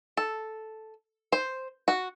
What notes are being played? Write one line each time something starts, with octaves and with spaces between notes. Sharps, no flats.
A4
C5
F#4